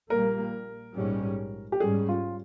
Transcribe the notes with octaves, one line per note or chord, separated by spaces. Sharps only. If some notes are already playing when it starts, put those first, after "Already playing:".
A#1 A#2 G3 A#3 A#4
A#1 G#2 G3 C#4
G4
G#2 G3 C#4 G#4
F4